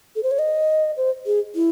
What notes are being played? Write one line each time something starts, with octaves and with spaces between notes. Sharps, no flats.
A4
C5
C#5
D#5
C5
G#4
E4